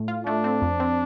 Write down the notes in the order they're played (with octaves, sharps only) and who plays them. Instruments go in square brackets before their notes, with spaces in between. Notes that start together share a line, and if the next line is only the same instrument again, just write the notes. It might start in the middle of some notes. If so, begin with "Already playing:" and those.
Already playing: [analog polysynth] A2
F4
[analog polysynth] A3 [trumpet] D4
[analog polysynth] C4
F2
C4